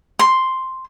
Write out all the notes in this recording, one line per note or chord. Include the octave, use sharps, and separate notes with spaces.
C6